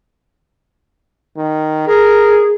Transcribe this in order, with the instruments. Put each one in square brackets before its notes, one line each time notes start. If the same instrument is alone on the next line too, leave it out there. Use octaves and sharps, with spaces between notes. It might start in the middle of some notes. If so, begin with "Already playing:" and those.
[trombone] D#3
[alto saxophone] G#4 [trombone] A#4